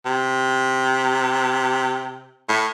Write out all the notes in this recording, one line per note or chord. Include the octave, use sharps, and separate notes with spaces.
C3
A2